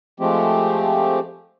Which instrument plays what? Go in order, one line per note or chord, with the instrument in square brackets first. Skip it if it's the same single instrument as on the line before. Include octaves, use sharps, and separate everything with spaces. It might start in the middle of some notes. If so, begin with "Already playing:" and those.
[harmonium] F3 G#3 A3 C4 G4